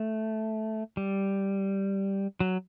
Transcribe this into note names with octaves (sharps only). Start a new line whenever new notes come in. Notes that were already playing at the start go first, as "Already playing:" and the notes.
Already playing: A3
G3
F#3